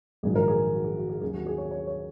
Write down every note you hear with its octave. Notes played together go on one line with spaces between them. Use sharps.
A#1 G#2 D#3 F#3 G#4
A#4
G#4
F#4
G#4
F#4
G#4
D#2 C#3 F#3 G#4
F#4
G#4
C#5
C#5
C#5